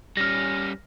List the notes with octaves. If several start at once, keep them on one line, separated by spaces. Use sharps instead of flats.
G3 C#4 F6 A#6